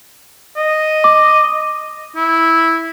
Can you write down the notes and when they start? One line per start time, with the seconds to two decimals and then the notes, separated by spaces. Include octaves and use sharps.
0.57 D#5
1.04 D6
2.16 E4